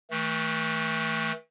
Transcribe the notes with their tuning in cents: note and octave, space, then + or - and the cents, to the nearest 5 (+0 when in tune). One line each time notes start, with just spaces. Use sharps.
E3 -45 A3 +0